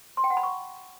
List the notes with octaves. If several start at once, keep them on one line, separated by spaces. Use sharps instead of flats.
C6
G5
F#5
B5
C#6